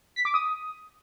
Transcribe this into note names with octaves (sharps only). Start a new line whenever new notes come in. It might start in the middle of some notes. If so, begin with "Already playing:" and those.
B6
D6
D#6